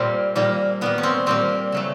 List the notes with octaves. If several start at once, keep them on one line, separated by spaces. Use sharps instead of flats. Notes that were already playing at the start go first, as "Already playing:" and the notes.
Already playing: A#2 G3 A#3 C4
A#2 G3 A#3
A#2 G3 A#3 B3
C#4
C4
A#2 G3 A#3 C4
C#3 F#3 A3